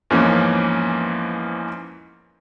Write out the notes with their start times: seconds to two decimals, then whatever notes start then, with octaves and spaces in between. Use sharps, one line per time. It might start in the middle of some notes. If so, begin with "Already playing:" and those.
0.10 E2 G#2 E3 F3 A#3 C#4